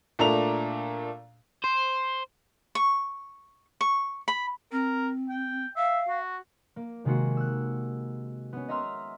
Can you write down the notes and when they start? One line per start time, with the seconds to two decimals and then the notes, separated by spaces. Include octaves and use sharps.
0.19 A#2 A3 D4 A4 A#5 F7
1.64 C5
2.75 C#6
3.81 C#6
4.28 B5
4.72 C4 A#4
5.29 G5
5.76 E5 F5
6.08 F#4
6.76 A#3
7.05 C3 D#3 G#3 A#3 F#4
7.37 E6 F#6
8.53 B3 C#4
8.68 D#5 E5 A#5 C6 E6 F6